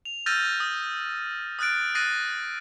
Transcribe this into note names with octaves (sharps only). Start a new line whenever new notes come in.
F7
E6 F6 G6 A6 A#6 D#7
D#6
D#6 F6 F#6 A6 D7
D#6 F#6 A6 A#6 C7 D#7